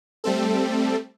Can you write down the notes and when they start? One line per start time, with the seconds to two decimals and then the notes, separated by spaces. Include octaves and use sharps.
0.24 G3 A3 C4 A4